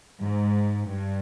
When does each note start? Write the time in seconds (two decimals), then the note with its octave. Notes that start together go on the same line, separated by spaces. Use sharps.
0.21 G#2
0.88 G2